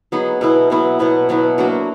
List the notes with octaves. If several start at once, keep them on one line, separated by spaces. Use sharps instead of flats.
F#3 B3 D#4 G#4
B2 F#3 B3 E4
B2 F#3 B3 E4
B2 F#3 B3 E4
B2 F#3 B3 E4
F#3 A#3 D4 F#4